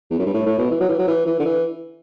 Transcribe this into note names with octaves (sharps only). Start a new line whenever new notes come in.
E2
F#2
G2
A2
A2
B2
E3
F#3
E3
F#3
E3
E3
D3
E3